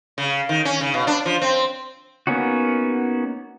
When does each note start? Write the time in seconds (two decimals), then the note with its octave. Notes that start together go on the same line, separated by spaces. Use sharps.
0.18 C#3
0.49 D#3
0.65 C#4
0.81 C#3
0.94 B2
1.07 D4
1.26 F3
1.42 C4
2.27 A#3 B3 C#4 D#4 F#4